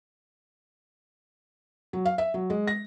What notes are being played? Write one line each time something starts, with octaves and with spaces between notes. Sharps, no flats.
F#3
F5
E5
F#3
G#3
A#6